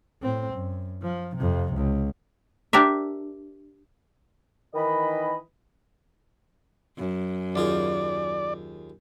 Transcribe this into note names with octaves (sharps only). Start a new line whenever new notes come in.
A2 C4
F#2
F3
F2 C3
C#2
D4 G4 A#4 E5
D#3 E3 D#5 B5
F#2
D#2 F4 G#4 D5